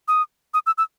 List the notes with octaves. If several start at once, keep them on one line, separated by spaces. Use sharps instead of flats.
D#6
D#6
E6
E6